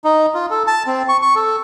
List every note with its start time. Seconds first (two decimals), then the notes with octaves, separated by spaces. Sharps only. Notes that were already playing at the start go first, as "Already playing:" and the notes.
0.04 D#4
0.34 F4
0.51 A4
0.67 A5
0.87 C4
1.09 C#6
1.22 C#6
1.36 A4